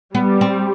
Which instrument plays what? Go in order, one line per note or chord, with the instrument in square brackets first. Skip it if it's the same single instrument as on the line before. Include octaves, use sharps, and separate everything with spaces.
[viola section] G3 [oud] B3
[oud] C4